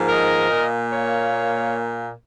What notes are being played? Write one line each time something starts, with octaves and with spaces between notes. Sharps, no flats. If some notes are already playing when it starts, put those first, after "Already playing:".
Already playing: G#2 F3 A#3
A#4 D#5
A#2 A#3
C#5 F5